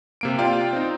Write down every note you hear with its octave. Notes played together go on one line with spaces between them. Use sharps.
C3 A#3 D7
F4 D5 F5 G5
C4 D#4